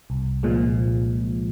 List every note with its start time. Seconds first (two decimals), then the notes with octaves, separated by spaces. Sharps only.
0.10 C2
0.43 A#2 F3 G#3